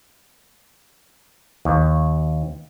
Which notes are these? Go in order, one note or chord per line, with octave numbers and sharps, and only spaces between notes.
D#2